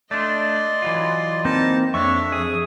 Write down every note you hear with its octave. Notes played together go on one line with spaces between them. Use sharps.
A3 D4 D5 D#5 C6
E3 F#3 F4
A#3 C4 D#4 A5
F2 D4 C#5 E5 C#6
G#4 D#6